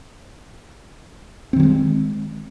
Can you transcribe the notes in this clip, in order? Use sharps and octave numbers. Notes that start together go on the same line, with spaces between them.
D#3 F3 G#3 C4